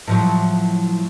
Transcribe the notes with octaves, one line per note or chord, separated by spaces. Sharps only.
A2 F3 F#3